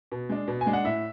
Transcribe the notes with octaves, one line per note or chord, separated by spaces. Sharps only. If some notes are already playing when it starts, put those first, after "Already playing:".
B2
G#3 D4
B2
G#5
G#3 D4
F#5
A2 E5